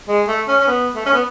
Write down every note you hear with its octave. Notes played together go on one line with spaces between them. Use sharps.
G#3
A3
C#4
C#4
B3
A3
C#4
B3